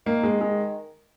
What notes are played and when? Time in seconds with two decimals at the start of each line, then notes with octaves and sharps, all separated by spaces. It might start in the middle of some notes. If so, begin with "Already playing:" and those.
0.06 D#3 A#3
0.24 G#3
0.41 G#3